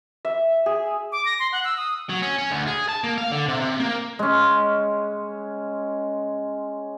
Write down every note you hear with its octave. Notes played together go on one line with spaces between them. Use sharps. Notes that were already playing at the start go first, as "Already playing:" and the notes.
E5
G#4
D6
A#6
C6
F#5
E6
D#6
F#3
C#4
C#4
D2
G#4
A5
A#3
F5
D3
C3
C3
A#3
G#3 C#4